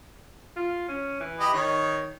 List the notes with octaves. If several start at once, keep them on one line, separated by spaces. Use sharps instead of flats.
F4
C#4
E3
G4 D#5 B5
D#3 D#4 C#5